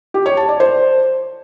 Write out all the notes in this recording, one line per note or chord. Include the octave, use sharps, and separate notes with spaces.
G4
C#5
A5
D5
C5